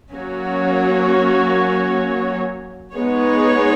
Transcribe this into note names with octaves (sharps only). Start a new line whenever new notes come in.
F#3 A#3 C#4 F#4 C#5
G#3 B3 D#4 G#4 C#5